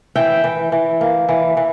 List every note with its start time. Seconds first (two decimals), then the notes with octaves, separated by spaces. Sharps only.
0.15 E3 E5 G5
0.44 E3
0.72 E3
1.01 A#3
1.29 E3
1.57 E3